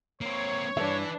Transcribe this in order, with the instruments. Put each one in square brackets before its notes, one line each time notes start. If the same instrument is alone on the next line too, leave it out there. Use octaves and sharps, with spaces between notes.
[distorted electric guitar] A#3 C4 [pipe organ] C#5
[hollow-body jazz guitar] G2 E5 [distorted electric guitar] E3 [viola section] D4